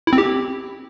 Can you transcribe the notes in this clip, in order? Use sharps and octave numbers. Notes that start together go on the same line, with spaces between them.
E4
C4
G4